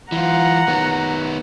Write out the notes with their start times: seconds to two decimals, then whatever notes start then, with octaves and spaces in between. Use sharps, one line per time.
0.12 E3 F4 F#5 A#5
0.68 D#3 B3